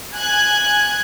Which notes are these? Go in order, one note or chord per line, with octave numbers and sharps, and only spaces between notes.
G#5 F#6 G#6